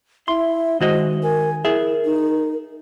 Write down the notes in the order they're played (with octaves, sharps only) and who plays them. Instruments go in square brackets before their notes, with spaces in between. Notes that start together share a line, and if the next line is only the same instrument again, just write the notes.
[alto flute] E4 [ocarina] E5 [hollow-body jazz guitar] C6
[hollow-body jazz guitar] D#3 F#4 D#5 [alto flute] G#3 [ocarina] C5
[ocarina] A#4 [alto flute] G#5
[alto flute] E4 [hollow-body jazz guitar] G#4 E5 [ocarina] A#4
[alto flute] D#4